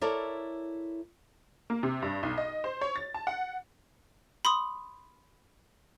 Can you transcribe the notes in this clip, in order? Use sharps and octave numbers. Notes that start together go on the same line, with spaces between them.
E4 A4 A#4 C#5 D5
A#3
C3
G2
B1
D#5
C5
C#5
A6
A5
F#5
B5 C6 D#6